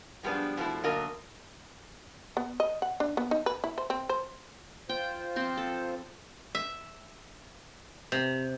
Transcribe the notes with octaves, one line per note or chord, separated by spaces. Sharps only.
F3 G3 G#3 B3 D4
B2 F3 G#3 A3 E4
B2 D3 F#3 A#3 A#4 D#5
B3
D#5
F#5
D4
B3
D#4
B4
E4
C5
C4
C5
F4 C5 G5
F3 C4 C6
A4
E5
C3